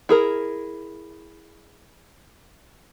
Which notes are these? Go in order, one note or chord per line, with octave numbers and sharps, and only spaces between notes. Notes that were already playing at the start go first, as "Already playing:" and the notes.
E4 G#4 A#4